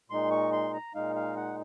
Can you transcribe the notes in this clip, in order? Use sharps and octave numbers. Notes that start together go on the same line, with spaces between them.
A#2 G#3 D#4 C6
C#6
C6
A#5
A#2 G#3 D#4 F5
F5
F#5